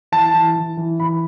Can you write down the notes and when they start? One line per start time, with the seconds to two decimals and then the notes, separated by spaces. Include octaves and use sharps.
0.12 E3 A5
0.34 E3
0.56 E3
0.77 E3
1.00 E3 B5